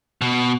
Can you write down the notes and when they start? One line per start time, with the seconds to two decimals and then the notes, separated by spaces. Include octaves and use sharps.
0.21 B2